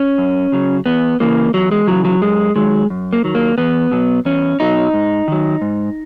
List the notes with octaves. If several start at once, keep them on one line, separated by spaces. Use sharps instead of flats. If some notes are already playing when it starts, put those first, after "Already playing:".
Already playing: C#4
F#2
C#3 F#3
E2 B3
C#3 E3 A#3
E2 F#3
G#3
C#3 E3 F#3
F#3
F#2 G#3
D#3 F#3 G#3
F#2
A#3
D#3 F#3
A#3
E2 B3
B2 F#3
E2 C#4
B2 F#3 D#4
G#2
D#3 F#3
G#2